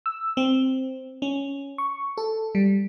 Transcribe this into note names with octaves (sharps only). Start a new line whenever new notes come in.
E6
C4
C#4
C#6
A4
G3